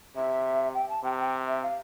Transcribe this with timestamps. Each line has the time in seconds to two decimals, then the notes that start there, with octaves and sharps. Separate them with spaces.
0.16 C3 E5
0.74 G5
0.89 A5
1.04 C3 G5
1.18 G5
1.48 E5
1.63 F5